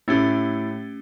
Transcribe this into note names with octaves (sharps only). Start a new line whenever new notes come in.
A2 A3 C#4 G4